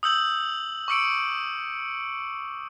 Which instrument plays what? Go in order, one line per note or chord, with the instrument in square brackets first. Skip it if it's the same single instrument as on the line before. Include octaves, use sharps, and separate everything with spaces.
[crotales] D#6 E6 G6 F#7
C#6 D6 E6 C#7 D7